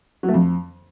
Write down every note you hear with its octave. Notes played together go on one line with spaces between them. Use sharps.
F#3
A3
F2